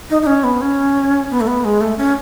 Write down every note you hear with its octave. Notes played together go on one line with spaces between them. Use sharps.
D#4
D#4
C#4
B3
C#4
B3
A3
B3
G#3
A3
C#4